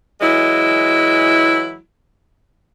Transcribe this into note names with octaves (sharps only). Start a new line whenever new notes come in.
E3 F#3 G#3 E4